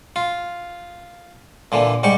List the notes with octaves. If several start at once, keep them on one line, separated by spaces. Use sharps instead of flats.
F4
A#2 D3 E3
G#2 G3 G4 C#6